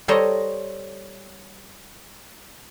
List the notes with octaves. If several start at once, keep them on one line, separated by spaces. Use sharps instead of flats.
G3 A4 C5 C#5 D#5 A#5